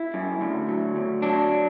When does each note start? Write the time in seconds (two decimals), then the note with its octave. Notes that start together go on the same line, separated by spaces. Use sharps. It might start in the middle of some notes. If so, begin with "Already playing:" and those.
Already playing: E4
0.14 F#2
0.41 D2
0.69 F#3
0.96 D2
1.22 F#3 D4